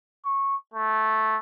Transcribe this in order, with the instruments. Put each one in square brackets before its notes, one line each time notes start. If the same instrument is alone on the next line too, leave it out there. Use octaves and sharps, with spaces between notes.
[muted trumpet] C#6
A3